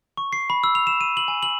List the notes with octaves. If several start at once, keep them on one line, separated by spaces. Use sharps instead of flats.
C#6
C7
B5
E6
F7
E7
D#7
F#7
G#5
F#7